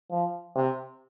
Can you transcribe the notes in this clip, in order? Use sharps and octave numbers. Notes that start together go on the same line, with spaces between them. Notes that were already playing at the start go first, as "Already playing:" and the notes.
F3
C3